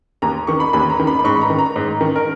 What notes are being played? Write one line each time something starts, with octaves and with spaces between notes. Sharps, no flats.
D#2 A#5
D#3 C#6
B5
D#2 B5
A#5
D#3
B5
B5
G#2 C#6
B5
A#5
D#3
A#5
G#2
D#3
A#4